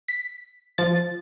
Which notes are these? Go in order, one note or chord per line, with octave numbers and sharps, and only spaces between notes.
B6
F3 A6